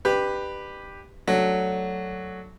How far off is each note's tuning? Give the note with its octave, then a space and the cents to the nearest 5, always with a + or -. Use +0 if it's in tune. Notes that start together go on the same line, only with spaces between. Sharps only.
D4 +40 G4 +5 B4 +0
F#3 +0 A3 +0 D4 +0